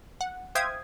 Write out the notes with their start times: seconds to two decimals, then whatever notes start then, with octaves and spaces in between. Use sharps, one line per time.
0.21 F#5
0.55 C5 E5 F5 G5 D#6 G#6